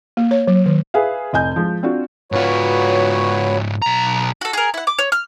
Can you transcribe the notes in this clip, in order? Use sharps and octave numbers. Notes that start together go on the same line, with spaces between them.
A#3
C#5
F#3
D#3
G#4 B4 E5 F5
F1 D#5 G#5 G6
F3 G#3
C4 D4 F4 F#4
G#2 F4 F#4 B4 C#5
B1 A#5
F#4 A4
G#4 A#4
E4 F#5
D6
C#5
F6